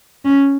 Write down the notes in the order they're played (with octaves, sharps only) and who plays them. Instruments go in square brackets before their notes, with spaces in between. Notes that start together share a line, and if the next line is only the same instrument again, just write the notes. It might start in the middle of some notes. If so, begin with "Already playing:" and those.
[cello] C#4